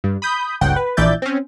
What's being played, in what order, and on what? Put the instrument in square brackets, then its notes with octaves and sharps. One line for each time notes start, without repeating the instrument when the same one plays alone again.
[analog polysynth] G2
B5 D#6 G6
G1 C#2 C#3 F#5 G5
B4
A#1 E3 D5 E5 G6 A6
C4 C#4